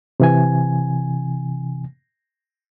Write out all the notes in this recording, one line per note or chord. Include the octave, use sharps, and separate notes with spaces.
C3 E3 G#5